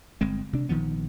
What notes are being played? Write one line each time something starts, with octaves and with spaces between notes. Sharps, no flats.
G1 G#3 C4
C3 D4
A#1 D#3 F3 B3